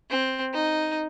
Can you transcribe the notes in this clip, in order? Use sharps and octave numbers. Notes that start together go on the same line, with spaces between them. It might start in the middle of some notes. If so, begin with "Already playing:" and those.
C4
D#4